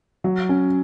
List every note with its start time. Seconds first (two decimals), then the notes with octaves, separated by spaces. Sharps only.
0.24 F#3
0.49 C#4